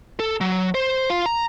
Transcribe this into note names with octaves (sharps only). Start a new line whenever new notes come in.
A4
F#3
C5
F4
A#5